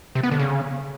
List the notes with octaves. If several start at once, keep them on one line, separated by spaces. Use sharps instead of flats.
C3
B3
D3
C#3